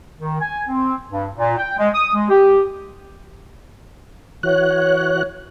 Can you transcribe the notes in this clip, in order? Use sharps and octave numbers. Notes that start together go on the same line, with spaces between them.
D#3
G#5
C4
G2
A#2
G5
G#3
D#6
G#3
G4
E3 F#4 C#5 F#6